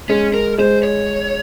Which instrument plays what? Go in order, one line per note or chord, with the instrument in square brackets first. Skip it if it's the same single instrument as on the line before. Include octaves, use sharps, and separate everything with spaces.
[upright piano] G#3 [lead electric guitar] C#4
[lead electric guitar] A#4
[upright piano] G#3 [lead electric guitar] C5
[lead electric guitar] C#5